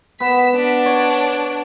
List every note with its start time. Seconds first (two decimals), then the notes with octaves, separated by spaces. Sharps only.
0.20 B3 B6 E7
0.56 D4
0.86 C#5